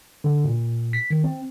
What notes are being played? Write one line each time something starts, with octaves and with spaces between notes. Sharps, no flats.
D3
A#2
B6
D#3
C4